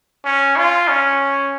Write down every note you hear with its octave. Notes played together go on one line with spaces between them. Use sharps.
C#4
F4
C#4